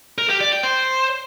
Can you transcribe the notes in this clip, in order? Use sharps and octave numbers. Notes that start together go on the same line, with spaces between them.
A#4
G4
D5
G5
C5